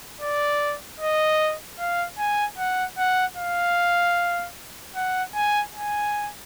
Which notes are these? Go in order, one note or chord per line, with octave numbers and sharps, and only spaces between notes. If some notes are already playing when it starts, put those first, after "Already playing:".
D5
D#5
F5
G#5
F#5
F#5
F5
F#5
G#5
G#5